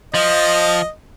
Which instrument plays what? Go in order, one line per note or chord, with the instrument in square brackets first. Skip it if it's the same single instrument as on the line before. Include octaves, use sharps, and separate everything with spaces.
[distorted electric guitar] F3 [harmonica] D#5